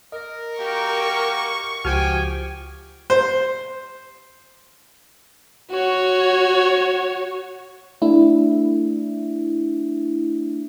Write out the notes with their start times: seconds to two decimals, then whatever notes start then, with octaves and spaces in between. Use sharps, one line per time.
0.12 A#4 D#5
0.59 A#3 F#4 G4 C#6
1.85 C#2 F3 F#4 G4 G5 G#5 F6
3.10 C5
5.71 F#4 C#5
8.02 A3 D4 E4